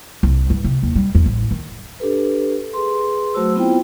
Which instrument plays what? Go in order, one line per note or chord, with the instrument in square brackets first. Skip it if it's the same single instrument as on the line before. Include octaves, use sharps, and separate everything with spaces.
[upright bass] C2
G2
C3
D#2
G3
E2
A1
D#3
[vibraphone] D4 G4 A4 B4
G#4 B4 C6
F#3 A3 F#4 C5 E6
B3 C4 E4 F4 C5 G5